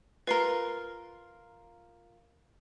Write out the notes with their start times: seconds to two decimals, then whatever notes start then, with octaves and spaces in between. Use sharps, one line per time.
0.27 F4 A#4 B4 C7 G7